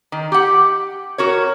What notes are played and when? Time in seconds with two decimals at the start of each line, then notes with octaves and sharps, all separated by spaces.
0.12 D#3
0.32 G4 F#5
1.18 F#4 A#4 C#5